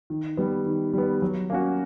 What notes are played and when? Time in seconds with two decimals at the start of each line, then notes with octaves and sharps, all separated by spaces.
0.10 D#3
0.37 G3 B3
0.66 D#3
0.93 G3 B3
1.22 F#3
1.50 A#3 C#4 F#4